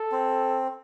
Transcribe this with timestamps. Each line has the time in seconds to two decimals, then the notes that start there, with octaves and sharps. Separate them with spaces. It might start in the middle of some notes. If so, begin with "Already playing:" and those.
Already playing: A4
0.12 C4